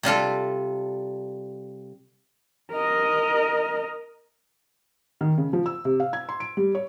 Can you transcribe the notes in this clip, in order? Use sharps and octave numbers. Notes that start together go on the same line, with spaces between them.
C3 G3 F4 A4
A#4 D#5
D#3
C#3
F3
E6
C3
F5
G#6
C6
D7
G3
C#5